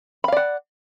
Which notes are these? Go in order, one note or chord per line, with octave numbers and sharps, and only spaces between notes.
D5 F5 F#5 B5